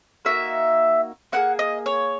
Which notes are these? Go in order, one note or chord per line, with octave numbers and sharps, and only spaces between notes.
A#3 D#4 F#4 E5
A#3 E4 G#4 F#5
D#5
C#5